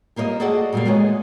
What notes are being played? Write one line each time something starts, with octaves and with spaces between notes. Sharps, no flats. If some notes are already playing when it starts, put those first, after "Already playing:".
G3 A#3 C5 C#5 D#5
F#4 G#4 A4 D5 D#5 F#5
A#2 F3 G3 A3 A#3
G#3 B3 F#4 C#5